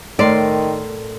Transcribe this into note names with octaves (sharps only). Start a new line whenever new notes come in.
A2 D#3 A#4 D5 C6